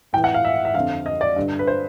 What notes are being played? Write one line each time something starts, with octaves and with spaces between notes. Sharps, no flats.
A2 E3 G5
F#5
F5
E5
E5
F2 D3 F5
D#5
D5
G2 D3
B4
C5